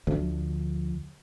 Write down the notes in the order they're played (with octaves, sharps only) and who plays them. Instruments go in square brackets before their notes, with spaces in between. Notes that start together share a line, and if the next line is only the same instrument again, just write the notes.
[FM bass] D2 [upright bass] D3 F3